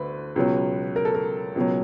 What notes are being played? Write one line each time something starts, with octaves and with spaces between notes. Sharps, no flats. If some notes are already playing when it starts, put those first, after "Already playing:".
Already playing: D2 D3 B4
C#2 B2 F#3
A#4
A4
A#4
C#2 B2 F#3